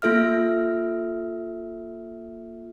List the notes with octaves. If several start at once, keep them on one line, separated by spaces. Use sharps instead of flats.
A#3 F4 A4 E5 F6